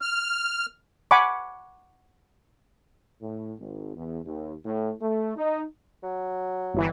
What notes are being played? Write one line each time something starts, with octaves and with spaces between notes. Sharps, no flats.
F6
F#5 G#5 B5 C#6 D6
A2
G#1
E2
D#2
A2
A3
D#4
F#3
G1 E3